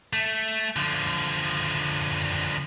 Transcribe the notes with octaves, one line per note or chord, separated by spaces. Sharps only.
A3
D3 F3